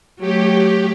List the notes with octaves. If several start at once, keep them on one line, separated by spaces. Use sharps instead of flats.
F#3 A3 G4